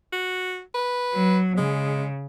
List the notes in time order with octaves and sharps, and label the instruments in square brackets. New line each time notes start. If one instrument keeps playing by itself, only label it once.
[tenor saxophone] F#4
B4
[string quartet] F#3
[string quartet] C#3 [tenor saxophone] G#3